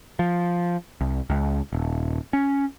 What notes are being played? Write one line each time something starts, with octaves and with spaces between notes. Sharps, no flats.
F3
C2
C#2
D#1
C#4